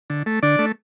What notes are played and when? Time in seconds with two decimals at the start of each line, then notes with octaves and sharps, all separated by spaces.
0.10 D3
0.26 A3
0.43 D3 D4 D5
0.59 A3